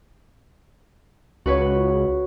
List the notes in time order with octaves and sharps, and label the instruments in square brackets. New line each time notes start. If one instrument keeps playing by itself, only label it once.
[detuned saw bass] C#2 [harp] F#4 B4 C#5